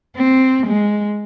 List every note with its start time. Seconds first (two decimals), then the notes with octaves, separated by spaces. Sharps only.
0.16 C4
0.66 G#3